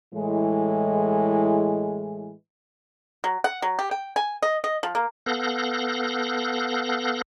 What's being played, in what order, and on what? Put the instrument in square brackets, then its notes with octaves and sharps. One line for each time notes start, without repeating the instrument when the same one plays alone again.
[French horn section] A2 E3 G#3
[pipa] F#3
F#5
F#3
G4
G5
G#5
D#5
D#5
F3
A#3
[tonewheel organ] B3 A4 F5 F#6 G6 A#6